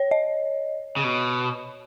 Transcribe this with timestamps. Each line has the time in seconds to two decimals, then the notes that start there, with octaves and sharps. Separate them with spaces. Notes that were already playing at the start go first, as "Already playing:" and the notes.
Already playing: C#5
0.11 D#5
0.97 C#3
1.04 B2